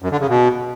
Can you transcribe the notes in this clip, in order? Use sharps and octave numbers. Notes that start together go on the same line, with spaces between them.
F#2
D3
C#3
B2